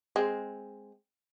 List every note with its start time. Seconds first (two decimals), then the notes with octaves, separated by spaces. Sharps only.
0.16 G#3 C4